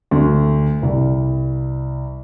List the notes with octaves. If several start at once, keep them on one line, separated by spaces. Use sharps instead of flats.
D2
C2